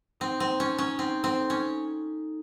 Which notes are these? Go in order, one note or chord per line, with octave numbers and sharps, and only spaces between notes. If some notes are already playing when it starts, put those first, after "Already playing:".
C4 D#4
C4
A#3
C#4
A#3
C#4
C4 D#4
C4 A4
C#4 D#4